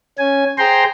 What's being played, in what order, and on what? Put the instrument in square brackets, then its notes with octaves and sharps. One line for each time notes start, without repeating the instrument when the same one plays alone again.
[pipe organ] C#4 G#5
G#4 C5 G5 A#5 C6